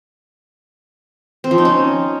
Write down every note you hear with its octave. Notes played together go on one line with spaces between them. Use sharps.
C4
F3
D#4
C#4